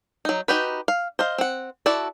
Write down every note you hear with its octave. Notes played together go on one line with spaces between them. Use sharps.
F#3 D#4
D#4 F#4 G4 B4
F5
C5 D#5 F5
C4 F#5
E4 F#4 A4 D5